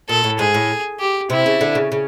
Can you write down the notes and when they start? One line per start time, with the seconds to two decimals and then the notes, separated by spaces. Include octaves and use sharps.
0.09 A#2 A4
0.24 A2
0.39 G#2 G#4
0.54 A2
1.00 G4
1.30 C3 E4
1.46 C#3
1.61 D3
1.75 C#3
1.92 C#3